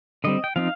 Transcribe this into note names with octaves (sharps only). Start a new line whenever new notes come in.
D3 G3 C4 D#5
G5
F3 C4 D#4 F5